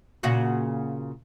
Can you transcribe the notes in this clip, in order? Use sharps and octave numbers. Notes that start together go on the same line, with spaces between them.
A#2 C#3 F#4